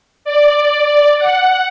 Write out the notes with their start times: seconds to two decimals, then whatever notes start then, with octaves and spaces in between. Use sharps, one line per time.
0.25 D5
1.18 F#5